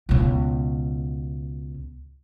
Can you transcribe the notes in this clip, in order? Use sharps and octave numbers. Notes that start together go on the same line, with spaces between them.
C#2 B2